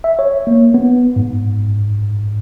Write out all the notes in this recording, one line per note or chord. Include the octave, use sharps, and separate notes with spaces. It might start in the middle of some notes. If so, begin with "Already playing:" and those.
E5
C#5
A#3
B3
G#2